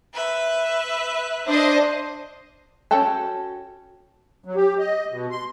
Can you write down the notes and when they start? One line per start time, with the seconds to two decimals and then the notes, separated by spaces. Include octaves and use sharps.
0.14 B4 E5
1.47 D4 C5 D#5
2.91 C#4 F#4 A4 G5 A5
4.45 F#3
4.56 G4
4.79 D#5
5.11 B2
5.31 C6